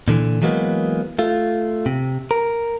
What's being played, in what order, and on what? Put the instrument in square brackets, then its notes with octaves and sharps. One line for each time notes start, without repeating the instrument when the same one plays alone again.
[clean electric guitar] A#2 D3 E3
E3 F#3 G#3 A#3 B3
A3 F4
C3
A#4